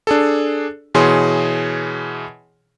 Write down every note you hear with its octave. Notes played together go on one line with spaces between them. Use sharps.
D4 G#4 A4
B2 E3 G#4 C#5 C6